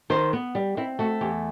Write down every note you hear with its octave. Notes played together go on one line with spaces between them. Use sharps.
D#3 C5
B3
G3
C4 E4
A3 F#4
E2 G4